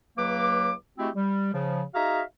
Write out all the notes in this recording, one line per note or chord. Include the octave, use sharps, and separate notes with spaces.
C#2 F#3 A#3 B4 D6
G#3 A3 C4 E4 F#4 G4
G3
C#3 F3
D#4 F#4 G#4 E5 F5 A#5